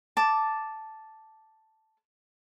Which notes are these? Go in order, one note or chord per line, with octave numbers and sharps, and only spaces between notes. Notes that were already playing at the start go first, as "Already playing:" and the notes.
A5 D6